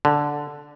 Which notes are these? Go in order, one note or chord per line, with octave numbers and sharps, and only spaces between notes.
D3